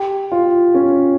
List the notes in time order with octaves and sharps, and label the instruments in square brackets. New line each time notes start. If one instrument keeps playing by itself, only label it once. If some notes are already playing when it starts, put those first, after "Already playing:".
Already playing: [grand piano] G4
F4
C#4